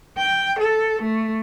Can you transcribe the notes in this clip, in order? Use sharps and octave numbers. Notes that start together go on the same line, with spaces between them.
G5
A4
A3